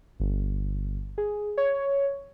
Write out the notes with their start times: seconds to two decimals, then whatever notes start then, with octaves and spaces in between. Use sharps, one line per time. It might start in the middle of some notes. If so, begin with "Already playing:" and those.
0.20 G1
1.18 G#4
1.58 C#5